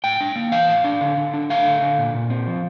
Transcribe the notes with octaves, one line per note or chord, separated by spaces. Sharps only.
A2 G5
D4
A#3
E3 F5
A2
D4
D3
D3
D4
A3 F5
D3
D3
A#2
A#2
C4
F3